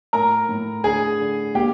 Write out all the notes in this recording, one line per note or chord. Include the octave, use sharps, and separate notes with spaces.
A2 A#4 A#5
A2
D3 G#4 G#5
D3
A#3 G4 G5